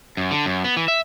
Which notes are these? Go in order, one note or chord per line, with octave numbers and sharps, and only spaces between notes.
F#2
D3
F#2
B3
E3
E5